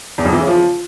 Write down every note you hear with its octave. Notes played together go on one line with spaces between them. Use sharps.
E2
F2
E3
C#3
F3